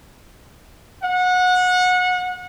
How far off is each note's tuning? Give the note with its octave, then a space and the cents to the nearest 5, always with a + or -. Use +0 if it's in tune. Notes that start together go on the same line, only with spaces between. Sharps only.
F#5 -25